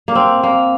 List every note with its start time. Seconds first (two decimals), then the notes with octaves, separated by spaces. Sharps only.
0.08 A#3
0.15 C4
0.43 A#3